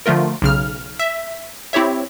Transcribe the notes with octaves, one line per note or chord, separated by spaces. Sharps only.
D3 F3 A3 F4 A#4
B1 C#3 F6
E5
C4 E4 G4 C#5 E5